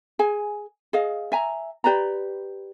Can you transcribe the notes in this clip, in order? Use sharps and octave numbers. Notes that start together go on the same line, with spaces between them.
G#4 G#5
G#4 D#5 F5
E5 G#5 A#5
G4 B4 D5 A#5